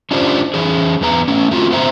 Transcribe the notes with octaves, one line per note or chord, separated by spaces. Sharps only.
C#4 D4 F4 G4 C5
E3 C#4 G#4
E2 B3 A#5
A3 C#4
A3 C4 F4 F#4
B3 C4 C5 E5 A#5